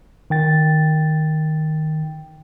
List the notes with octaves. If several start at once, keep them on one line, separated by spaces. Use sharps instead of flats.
D#3 G5 A6